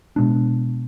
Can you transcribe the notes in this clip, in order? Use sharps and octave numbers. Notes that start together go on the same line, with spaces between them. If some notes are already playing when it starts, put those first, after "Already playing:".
B2 G#3 B3 D4